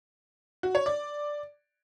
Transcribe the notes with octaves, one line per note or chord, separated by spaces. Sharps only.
F#4
C#5
D5